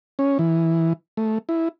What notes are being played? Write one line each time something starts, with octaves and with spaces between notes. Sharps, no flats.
C#4
E3
A3
E4